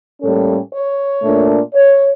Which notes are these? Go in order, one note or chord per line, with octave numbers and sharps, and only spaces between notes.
A2 G3 A#3 C#4 A4
C#5
A#2 A3 D4
C#5